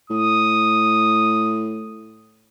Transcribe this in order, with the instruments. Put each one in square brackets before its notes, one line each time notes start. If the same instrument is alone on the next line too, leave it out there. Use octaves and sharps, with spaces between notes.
[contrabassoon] A2 [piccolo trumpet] D#6